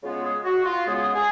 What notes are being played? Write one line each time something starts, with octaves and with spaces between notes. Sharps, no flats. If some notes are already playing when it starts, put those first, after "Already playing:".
C#3 G#3 B3 F4
G#4
F#4
F4
C#3 G#3 B3 G#4
G#4